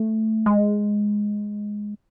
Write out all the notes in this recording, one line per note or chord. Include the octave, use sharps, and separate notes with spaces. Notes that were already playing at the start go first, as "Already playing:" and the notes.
Already playing: A3
G#3